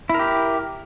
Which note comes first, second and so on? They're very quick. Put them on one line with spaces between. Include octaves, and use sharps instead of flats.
E4 A#4 G4